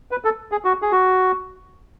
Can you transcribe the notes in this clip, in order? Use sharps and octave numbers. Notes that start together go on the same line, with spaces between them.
B4
A4
G#4
F#4
G#4
F#4